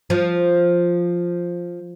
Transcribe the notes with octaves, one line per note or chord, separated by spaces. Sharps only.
F3